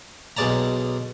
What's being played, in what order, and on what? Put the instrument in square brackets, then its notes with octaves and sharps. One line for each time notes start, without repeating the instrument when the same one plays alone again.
[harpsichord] B1 B2 G#3 D5 A5 A#5